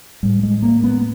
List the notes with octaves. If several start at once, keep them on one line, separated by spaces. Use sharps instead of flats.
A2 G3
G#3
A#3
B3